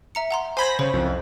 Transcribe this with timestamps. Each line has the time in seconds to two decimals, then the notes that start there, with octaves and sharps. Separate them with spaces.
0.15 E5 A#5 C#7
0.31 F#5 A#5 C6
0.57 C5 G#5 B5 C6 G#6 A#6
0.79 C#3 C5
0.93 C2 F2